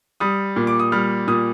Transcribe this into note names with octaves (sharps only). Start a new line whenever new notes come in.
G3 D#6
A#2
D6
D#6
G3 F6
A#2 D#6